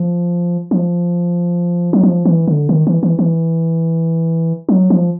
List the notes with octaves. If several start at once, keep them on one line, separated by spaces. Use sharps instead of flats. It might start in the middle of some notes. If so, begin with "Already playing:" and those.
Already playing: F3
F3
F#3
F3
E3
D3
D#3
E3
E3
E3
F#3
F3